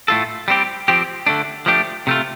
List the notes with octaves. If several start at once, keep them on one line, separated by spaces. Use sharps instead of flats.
A2 A3 F4 A4
G3 C4 G4
F3 C4 G4
D3 A3 D4
F3 A3 D4 G4
C3 A3 F4